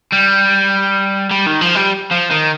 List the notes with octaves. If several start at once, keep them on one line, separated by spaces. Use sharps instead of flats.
G3
G3
D#3
F3
G3
F3
D#3